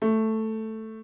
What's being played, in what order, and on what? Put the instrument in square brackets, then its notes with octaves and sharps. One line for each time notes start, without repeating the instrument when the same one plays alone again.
[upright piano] A3